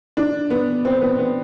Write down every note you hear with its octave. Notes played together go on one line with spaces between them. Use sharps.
D4
B3
C4
B3
B3